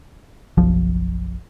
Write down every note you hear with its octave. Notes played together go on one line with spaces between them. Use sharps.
F#1 B1 F3